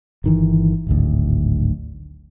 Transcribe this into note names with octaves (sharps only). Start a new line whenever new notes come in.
G1 D#3 E3
D1 G#1 D2